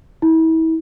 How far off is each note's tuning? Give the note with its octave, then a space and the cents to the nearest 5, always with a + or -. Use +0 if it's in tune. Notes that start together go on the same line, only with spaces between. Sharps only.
E4 -35